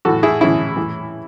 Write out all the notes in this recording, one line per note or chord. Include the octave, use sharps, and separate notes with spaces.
A2 E3 F#4 A4
E4 G#4
A2 E3 C#4 E4
A2 E3